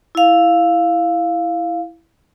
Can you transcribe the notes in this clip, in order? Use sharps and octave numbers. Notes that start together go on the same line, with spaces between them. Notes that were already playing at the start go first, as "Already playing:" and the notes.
E4 F5